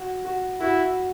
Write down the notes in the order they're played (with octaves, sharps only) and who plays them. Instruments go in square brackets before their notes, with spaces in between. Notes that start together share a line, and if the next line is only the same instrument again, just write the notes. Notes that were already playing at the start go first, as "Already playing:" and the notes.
Already playing: [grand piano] F#4
F#4
[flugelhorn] E4 [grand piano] F#4